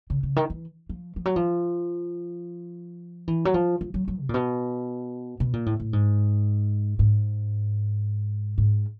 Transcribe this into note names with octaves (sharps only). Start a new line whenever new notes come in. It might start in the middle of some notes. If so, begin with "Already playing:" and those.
C#3
C#3
D#3
E3
F3
F3
F#3
F3
E3
F#3
F3
F3
F#3
F#3
C3
A#2
B2
B2
A#2
A2
A2
G#2
G#2
G#2